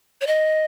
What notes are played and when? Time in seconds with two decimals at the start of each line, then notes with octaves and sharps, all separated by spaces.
0.21 C#5
0.27 D#5